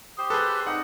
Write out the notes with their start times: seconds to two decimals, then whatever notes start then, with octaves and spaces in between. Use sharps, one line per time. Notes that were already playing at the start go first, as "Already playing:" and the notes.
0.18 G4 C5 C6 D#6
0.30 G#4 A4 B4
0.48 B4
0.67 C4 D#4 D5 F#5